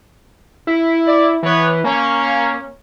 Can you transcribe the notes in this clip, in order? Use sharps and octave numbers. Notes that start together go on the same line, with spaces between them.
E4
D5
E3 B3 B4 C#5
A#3 C#4